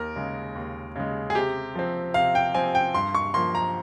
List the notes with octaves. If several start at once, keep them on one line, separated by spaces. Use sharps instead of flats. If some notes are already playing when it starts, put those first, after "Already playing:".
Already playing: D#2 A#4
C#3 G#3
D#2
C#3 G#3
G#4
C3 G4
F3 C4
C3 F5
G5
F3 C4 G#5
G5
G2 C6
C#6
F3 A#3 C6
A#5